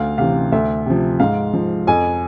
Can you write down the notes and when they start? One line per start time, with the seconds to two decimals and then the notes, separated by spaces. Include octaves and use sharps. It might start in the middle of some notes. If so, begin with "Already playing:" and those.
Already playing: D2 F5
0.18 C3 E3 F5
0.52 D2 E5
0.86 C3 F3
1.20 G#2 F5
1.53 F3
1.87 F2 G#5